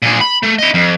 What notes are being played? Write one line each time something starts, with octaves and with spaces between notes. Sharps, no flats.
A#2 G#4
B5
A3
E4 D#5
F2